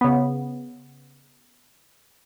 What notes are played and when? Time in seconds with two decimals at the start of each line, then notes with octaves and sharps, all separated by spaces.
0.01 C#3 B3